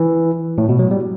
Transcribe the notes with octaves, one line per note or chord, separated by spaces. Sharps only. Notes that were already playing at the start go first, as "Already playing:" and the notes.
Already playing: E3
A2
B2
F#3
G3